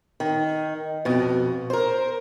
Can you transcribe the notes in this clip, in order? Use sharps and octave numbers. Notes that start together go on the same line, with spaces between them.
D#3
F2 B2
A#4 C5